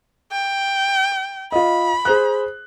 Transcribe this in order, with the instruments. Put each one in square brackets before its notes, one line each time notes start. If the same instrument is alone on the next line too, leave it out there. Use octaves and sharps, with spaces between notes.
[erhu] G5
[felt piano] F4 D#5 [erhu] B5
[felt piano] G#4 C5 F#6